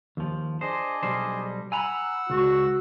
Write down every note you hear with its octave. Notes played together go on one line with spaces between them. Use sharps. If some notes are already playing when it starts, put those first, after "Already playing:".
D#2 F3
D4 G#4 C5 D#5
B1 G3 C5
F#5 G#5 A#5 B5 E6
C#2 F#4